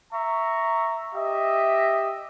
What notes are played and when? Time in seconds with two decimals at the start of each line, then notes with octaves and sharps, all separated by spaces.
0.13 E5 A#5 C#6
1.14 G4 D#5 E5